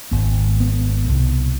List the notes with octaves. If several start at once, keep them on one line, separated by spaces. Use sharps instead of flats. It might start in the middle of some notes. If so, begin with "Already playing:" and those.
G#1 G#2 B3
B3
C2 B2